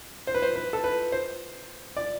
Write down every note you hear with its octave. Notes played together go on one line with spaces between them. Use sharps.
C5
B4
C5
B4
A4
B4
C5
D5